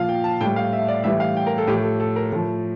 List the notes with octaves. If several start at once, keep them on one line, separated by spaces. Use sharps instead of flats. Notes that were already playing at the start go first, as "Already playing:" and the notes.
Already playing: A#2 F3 F5
G5
A5
A2 G3 G5
F5
E5
D5
A2 E3 G3 E5
F5
G5
A#4
A4
A2 G4
F3
A4
A4
A#4
A2 F3